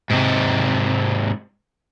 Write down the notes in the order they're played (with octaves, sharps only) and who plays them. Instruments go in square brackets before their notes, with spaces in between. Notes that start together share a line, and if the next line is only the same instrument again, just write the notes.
[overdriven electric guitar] G#2 C3